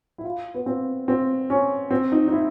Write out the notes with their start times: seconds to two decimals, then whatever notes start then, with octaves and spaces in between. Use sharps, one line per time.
0.18 E4
0.25 F4
0.54 B3
0.66 C4
1.08 C4
1.50 C#4
1.91 C4
2.12 D#4
2.28 D#4
2.32 E4